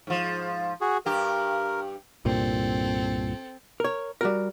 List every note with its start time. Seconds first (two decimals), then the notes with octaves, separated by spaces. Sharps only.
0.07 G#2 F3
0.81 F#4 G#4
1.06 G2 G4 A#4
2.25 C2 G2 A#2 C4 A4
3.80 A#4 C#5
4.21 G3 F#4 A#4